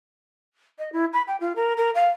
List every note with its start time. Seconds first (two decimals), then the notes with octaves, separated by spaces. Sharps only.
0.78 D#5
0.92 E4
1.13 B5
1.27 G5
1.40 F4
1.56 A#4
1.77 A#4
1.94 F5